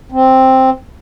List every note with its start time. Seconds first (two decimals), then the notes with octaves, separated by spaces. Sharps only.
0.12 C4